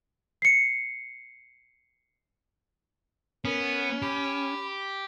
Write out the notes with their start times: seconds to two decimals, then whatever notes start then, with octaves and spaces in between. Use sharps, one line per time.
0.42 C7 C#7
3.45 B3 C#4 A#4
4.02 G4 B5